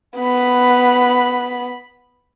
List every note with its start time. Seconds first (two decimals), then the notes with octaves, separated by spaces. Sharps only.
0.17 B3 B5